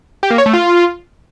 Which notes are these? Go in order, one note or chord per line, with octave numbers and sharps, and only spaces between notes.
G4
A#3
C#5
A3
F4